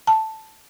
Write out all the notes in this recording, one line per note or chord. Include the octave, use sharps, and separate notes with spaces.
A5